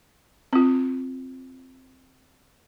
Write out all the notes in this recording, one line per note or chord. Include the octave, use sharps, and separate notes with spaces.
C4 F4